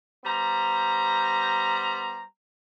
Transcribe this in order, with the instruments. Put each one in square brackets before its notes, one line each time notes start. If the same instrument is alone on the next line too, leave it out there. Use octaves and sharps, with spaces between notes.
[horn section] G3 B3 C5 A#5